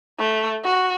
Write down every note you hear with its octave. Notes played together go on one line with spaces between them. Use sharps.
A3
F#4